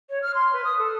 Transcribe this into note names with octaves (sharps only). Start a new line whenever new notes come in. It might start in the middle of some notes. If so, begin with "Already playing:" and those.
C#5
F6
C6
B4
D#6
A4